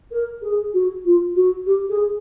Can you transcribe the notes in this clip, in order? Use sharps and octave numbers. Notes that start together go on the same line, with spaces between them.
A#4
G#4
F#4
F4
F#4
G4
G#4